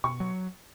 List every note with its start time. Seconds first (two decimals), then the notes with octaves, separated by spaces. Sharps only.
0.04 B2 C#6
0.20 F#3